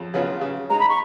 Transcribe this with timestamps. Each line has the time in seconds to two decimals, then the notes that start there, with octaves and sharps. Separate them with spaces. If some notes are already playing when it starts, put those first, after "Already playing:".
Already playing: F2 C#3
0.14 C#3 F#3 B3 F4
0.41 C#3
0.70 G#3 D#4 A#5
0.80 B5
0.89 C#6